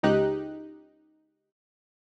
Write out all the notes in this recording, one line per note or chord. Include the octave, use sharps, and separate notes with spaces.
C#2 D#4 G4 F#6